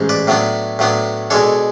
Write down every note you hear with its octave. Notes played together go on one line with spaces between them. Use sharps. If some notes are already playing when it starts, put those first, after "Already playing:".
Already playing: A1 G#2
B4 D5
A2 F#3 B3 D4
A2 F#3 B3 D4
B2 G#3 D4 A4 C#5